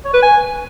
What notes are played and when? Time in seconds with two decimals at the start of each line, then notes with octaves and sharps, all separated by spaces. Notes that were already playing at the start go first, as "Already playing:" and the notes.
0.05 C#5
0.14 B4
0.22 G#5